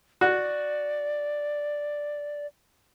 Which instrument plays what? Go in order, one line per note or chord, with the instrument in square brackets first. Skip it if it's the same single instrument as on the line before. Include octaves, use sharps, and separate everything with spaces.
[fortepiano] F#4 [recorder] D5